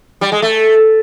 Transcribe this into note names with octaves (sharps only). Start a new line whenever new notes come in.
G3
G#3
A3